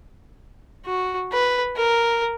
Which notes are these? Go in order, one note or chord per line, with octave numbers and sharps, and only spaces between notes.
F#4
B4
A#4